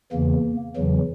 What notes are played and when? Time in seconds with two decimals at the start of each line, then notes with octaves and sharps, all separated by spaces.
0.12 E2 C#3 E3 A#3
0.77 E2 C#3 E3 F#3